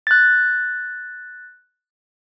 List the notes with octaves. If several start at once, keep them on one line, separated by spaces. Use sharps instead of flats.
F#6 A6